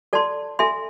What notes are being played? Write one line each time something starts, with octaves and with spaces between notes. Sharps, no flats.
A4 D5 A5 C6
A4 E5 G#5 C6